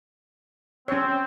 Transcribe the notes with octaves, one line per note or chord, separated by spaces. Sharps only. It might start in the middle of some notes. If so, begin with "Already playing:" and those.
C4 C#4 C#5